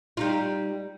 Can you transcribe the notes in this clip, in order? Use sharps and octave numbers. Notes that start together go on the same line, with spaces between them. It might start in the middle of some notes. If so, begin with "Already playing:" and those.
G3 D#4 F4